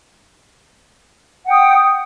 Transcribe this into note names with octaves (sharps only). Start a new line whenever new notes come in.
F#5 G5 D#6